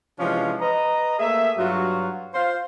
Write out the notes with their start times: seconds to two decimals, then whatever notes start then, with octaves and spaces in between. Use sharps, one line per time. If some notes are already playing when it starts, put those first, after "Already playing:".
0.20 C3 E3 F3 G#3 C#4 D4
0.61 B4 D#5 A#5
1.19 A3 A#3 G#4 E5
1.58 G2 F#3 F4 F#4
2.34 F4 C5 F5